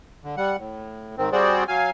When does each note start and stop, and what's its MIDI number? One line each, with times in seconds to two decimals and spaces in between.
0.24 0.36 50
0.37 0.57 55
0.37 0.57 78
0.58 1.15 45
1.17 1.30 44
1.17 1.30 51
1.17 1.30 60
1.32 1.64 55
1.32 1.64 60
1.32 1.64 66
1.32 1.64 68
1.32 1.64 72
1.32 1.64 74
1.68 1.90 54
1.68 1.90 77
1.68 1.90 80